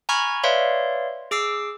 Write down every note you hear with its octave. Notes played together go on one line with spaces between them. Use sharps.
G#5 A#5 B5 C#6 F6 G#6
B4 C#5 D5 E5 F5 C6
G#4 D6 E6 C7